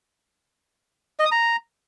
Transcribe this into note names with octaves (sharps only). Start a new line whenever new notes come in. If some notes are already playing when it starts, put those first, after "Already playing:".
D#5
D#6
A#5